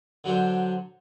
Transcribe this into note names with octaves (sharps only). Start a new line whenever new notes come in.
D3 F#3 D4 C5